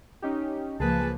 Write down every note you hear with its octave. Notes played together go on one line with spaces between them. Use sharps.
C#4 D#4 G4
C#2 F3 A#3 G#4 B4 A5